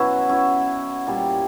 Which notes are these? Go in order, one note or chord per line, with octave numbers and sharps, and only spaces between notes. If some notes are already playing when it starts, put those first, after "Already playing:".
Already playing: B2 F#3 C#4 E4 F#4
C#4 E4
A#2 G3